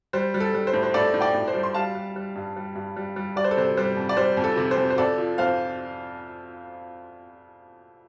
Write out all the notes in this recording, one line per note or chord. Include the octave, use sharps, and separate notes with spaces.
G3 C5
G3
A4
G3
C5
A2
C5
A2 A4 D5
A2
D5 G5
A2
C5
G3
C6
G3 F5 A5
G3
G3
G2
G3
G2
G3
G3
G3 D5
C5
A4
C3 C5
G3 C5
F2
D5
G3 C5
F2
A4
C3
C5
F2
C5
F2 A4 D5
F3
F2 C5 F5